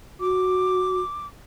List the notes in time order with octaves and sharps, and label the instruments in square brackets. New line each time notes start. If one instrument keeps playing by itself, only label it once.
[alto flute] F#4 [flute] D6